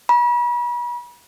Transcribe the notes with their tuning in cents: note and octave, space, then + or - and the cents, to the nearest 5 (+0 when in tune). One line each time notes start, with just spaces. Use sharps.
B5 -40